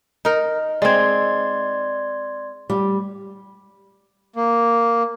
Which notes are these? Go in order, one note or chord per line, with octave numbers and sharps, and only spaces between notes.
D#4 A#4
G#3 C4 D5 C6 G#6
G3
A#3